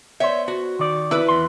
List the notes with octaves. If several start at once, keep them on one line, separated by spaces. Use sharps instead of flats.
B3 C5 C#5 E5
F#4
D#3 D5
E4 B4
E2 C6